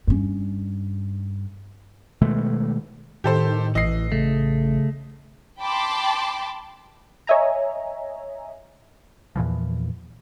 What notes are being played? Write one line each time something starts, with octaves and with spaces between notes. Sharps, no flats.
G2 C#4
B2 D#3 G#3 A3
A2 D#3 G4 A4 C5
A1 E3 D#5 C7
C#3 A3
G5 A5 B5 C6 D6
C#5 D#5 E5 G#5 A#5
E2 A#2 E3 F3